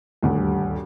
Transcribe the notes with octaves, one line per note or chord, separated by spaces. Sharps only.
D#1 D2 G2